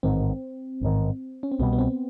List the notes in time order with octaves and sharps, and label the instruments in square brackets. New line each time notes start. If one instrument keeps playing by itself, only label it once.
[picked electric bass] A1 G#2 D#3 [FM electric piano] C4
[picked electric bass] A1 G#2 D#3
[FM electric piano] C#4
C4
[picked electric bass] C2 B2 G3 [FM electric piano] B3
[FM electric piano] B3
C4